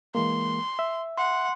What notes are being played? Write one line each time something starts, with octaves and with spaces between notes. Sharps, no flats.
E3 G#3 A#3 C6
E5
F#5 C6